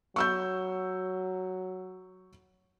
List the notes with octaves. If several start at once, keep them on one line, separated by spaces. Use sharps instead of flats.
F#3 C#6 E6 G6